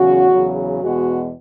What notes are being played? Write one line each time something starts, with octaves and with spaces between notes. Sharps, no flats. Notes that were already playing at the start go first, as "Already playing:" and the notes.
Already playing: E2 C#3 F#3 C#4 F#4
E2 C#3 F#3
E2 B2 G#3 F#4